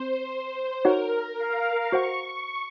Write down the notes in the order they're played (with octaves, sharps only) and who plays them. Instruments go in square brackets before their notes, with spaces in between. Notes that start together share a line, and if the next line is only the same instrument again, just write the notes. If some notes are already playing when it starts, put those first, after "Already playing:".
Already playing: [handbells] C4 [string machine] C5
[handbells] D#4 F#4 C#5 F#5 [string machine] A#4
[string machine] F5
[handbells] F#4 C5 F#5 [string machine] C#6